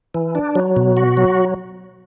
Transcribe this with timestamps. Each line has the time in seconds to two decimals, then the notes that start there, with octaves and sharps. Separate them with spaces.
0.15 E3
0.35 D4
0.55 F#3
0.76 B2
0.97 F#4
1.17 F#3